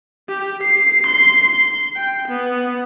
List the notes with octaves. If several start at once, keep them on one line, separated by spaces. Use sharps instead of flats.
G4
C7
C6
G5
B3